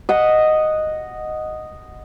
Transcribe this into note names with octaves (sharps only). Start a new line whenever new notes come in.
D#5 F#5